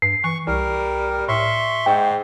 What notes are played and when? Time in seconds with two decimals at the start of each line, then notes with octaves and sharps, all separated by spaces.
0.02 G2 C7
0.24 E3 C#6
0.47 C2 G3 A#4
1.28 A2 E5 C6 C#6
1.86 G#2 G5